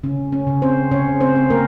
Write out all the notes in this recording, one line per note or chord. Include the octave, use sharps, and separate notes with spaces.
C#3 C#4
C#4
C#3
C4 C5
C#3 C#4 C#5
C4 C5
C4
A#3 A#4